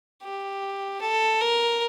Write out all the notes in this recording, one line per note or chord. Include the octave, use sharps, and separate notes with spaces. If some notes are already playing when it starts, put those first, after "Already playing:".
G4
A4
A#4